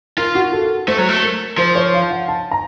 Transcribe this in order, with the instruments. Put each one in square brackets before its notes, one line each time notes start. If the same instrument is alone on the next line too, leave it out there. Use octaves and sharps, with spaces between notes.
[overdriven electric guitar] F4 [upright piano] A#4
[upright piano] F#4
A4
[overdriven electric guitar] A3 [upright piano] C5
[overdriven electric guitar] F#3
A3
[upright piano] A#4
[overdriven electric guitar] F3 [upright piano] C5
[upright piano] C#5
F5
F#5
A5
A#5